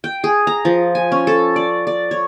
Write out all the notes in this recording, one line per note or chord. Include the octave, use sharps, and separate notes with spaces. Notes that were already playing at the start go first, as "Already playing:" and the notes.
G5
G#4
A#5
F3
G#5
C#4
A4
D5
D5
C#5